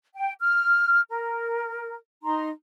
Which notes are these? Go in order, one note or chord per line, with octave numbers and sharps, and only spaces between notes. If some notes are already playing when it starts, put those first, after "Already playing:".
G5
F6
A#4
D#4 A#5 C6